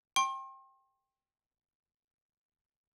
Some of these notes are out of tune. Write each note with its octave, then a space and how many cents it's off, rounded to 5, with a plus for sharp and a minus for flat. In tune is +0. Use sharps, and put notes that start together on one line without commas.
G5 +0 C6 +40